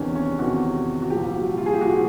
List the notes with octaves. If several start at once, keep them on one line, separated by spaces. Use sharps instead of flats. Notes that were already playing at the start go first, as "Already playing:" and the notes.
Already playing: E2 C3 D#3 C#4 D4
C#4
E2 C3 D#3 F#4
F#4
C2 A#2 F3 G4
F#4
F4
G#4
G4
C2 A#2 F3 F#4